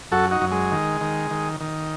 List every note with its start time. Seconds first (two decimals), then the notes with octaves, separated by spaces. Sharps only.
0.12 F#2 F#4 A4
0.31 D#4 F#4
0.41 F#2
0.51 G#3
0.72 D#3
1.01 D#3
1.31 D#3
1.60 D#3